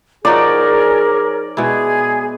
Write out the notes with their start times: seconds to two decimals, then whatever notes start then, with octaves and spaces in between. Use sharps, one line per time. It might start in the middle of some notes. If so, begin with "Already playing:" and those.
0.25 F3 D#4 F#4 G#4 A#4 C#5 D5
1.57 B2 G#3 E4 G#4